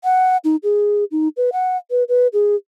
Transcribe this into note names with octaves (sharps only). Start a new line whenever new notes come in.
F#5
D#4
G#4
D#4
B4
F#5
B4
B4
G#4